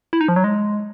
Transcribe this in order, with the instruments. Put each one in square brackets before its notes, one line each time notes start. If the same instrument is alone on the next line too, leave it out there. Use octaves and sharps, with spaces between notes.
[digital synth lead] E4
D#4
F3
F#3
G#3